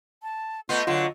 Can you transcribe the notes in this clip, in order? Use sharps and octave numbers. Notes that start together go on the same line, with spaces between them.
A5
A3 B3 F4 D#5
D3 F#3 F4